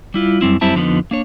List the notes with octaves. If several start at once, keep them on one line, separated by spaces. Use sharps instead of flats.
G3 E4 F4
F#2 G3 C4 E4
F#2 G3 C4 E4 A5
F2 D3 F3 B3 D#4
A#3 D4 C#5